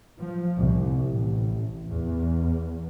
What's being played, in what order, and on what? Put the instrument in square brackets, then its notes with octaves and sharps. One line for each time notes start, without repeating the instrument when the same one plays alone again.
[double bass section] F3
C2
A1
E2